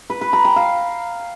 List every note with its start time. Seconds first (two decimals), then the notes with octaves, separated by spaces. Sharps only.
0.10 B4
0.21 B4
0.33 A#5
0.45 G5
0.56 F5